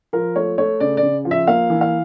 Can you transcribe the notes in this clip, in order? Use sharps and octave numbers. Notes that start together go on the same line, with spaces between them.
F3 A#4
A3 C#5
A3 C#5
C#3 D5
D5
C#3
F3
E5
A#3 F5
E3
F5